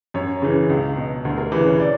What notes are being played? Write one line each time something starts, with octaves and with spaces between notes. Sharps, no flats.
F#2 C#5
C#3 E3
C#2
B2
D2
A#4
C#3 E3 B4
C#5
D5